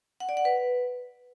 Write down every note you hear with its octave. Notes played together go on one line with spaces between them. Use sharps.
F#5
D5
F#5
B4